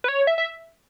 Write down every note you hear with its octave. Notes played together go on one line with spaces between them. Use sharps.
B4
C#5
E5
E5